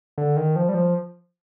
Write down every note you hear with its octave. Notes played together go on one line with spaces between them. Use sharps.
D3
D#3
F3
G3
F3